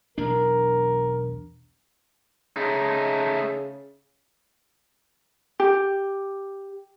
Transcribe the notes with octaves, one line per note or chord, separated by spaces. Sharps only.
B1 E2 D4 A#4
C#3 A3 D#4
G4